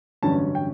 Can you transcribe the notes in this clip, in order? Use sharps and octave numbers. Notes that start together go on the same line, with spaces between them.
A1 G2 D3 F#3 C#4 A5
G5